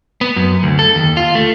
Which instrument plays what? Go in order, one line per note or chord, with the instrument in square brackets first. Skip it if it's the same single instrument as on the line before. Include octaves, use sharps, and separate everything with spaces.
[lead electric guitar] B3
F#2
D2
A4
D#2
F4
A3